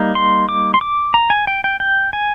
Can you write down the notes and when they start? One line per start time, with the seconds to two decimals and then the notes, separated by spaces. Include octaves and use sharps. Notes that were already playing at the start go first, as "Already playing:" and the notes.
Already playing: G3 A#3 D#4
0.15 C6
0.49 D6
0.74 C6
0.81 D6
1.14 A#5
1.30 G#5
1.47 G5
1.64 G5
1.80 G5
2.13 G#5